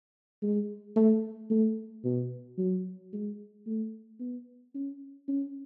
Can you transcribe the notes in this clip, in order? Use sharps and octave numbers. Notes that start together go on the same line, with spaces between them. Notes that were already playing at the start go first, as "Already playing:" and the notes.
G#3
A3
A3
B2
F#3
G#3
A3
B3
C#4
C#4